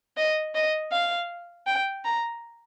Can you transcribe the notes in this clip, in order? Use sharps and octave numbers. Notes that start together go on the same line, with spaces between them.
D#5
D#5
F5
G5
A#5